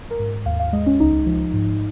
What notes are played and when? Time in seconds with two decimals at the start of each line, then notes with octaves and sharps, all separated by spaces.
0.11 A#4
0.19 G#2
0.46 D#2 F5
0.59 F5
0.73 G#3 D#5
0.86 C#4
1.00 C#2 D#4
1.26 F3
1.54 G#2